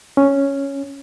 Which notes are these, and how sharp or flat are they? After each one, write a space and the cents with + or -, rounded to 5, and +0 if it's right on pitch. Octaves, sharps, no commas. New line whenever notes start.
C#4 +0